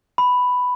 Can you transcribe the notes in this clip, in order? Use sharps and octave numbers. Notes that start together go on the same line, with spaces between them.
B5